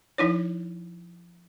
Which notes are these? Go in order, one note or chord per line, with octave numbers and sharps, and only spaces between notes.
F3 D#4 E4 C#5